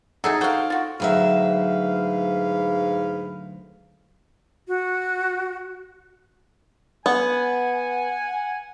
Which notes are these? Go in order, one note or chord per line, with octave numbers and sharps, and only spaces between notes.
F#3 D#4 G#4 A4 E5
F#4 C5 F5 G5
F4 F#4
D2 G#2 F#3 B4 E5 F5
F#4
B3 F#5 G#5